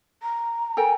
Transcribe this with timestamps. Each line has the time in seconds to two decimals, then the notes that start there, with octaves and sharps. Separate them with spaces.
0.22 A#5
0.77 A4 A#4 G5 G#5